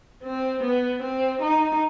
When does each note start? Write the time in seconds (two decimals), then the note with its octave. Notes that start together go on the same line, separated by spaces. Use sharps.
0.24 C4
0.63 B3
1.02 C4
1.41 D#4